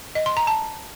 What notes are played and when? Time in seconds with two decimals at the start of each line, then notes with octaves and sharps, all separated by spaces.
0.15 D#5
0.26 C6
0.37 A#5
0.47 A5